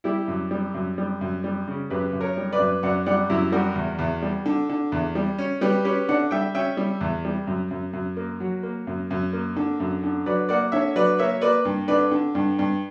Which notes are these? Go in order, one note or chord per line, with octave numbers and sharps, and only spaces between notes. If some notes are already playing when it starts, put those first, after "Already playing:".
G3 E4 G4
F#2
G3
F#2
G3
F#2
G3
C#3
F#2 G4 B4
F#2
A#4 C#5
G3
B4 D5
F#2
F#2 D5 F#5
G3 D5 F#5
F#2 E4 G4
G3 F#4 A#4
E2
E2
G3
D3
D3
E2
G3
C#4
G3 G4 B4
C#4 G4 B4
D3 D5 F#5
G3 E5 G5
C#4 E5 G5
G3
E2
G3
F#2
F#2
F#2
A#3
F#3
A#3
F#2
F#2
A#3
D3
F#2
D3
F#3 B4 D5
A#3 D5 F#5
D3 C#5 E5
F#3 B4 D5
A#3 C#5 E5
A#3 B4 D5
G2
D3 B4 D5
D3
G2
G2